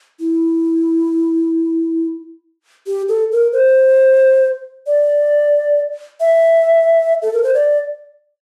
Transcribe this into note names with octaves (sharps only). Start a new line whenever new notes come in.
E4
G4
A4
A#4
C5
D5
E5
A4
A#4
C5
D5